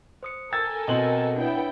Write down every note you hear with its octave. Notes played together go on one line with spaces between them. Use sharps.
C5 D#6 C#7
A4 A#4 G5 G#5 E6 G#6 A6
B2 C4 D#5 G5 F#7
B3 D4 E4 C#5 G5